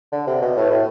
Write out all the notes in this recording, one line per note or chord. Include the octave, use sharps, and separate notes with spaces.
D3
C3
B2
A2
A2